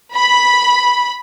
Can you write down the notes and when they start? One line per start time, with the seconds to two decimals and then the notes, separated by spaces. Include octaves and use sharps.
0.14 B5